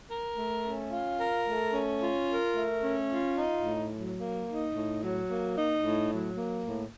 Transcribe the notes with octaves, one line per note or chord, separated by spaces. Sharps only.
A#4
A3
C#4
F4
A#4
A3
C#4
F4
A#4
A3
C#4
F4
D#4
A2
F#3
A#3
D#4
A2
F#3
A#3
D#4
A2
F#3
A#3
A2